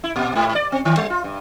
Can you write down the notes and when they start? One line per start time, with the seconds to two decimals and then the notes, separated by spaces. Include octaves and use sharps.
0.04 E4
0.16 A#2
0.35 G#2
0.55 D5
0.72 C4
0.85 D#3
0.97 G3
1.10 F4
1.24 G2